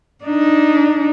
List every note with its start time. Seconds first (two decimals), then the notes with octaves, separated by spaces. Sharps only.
0.25 D4 D#4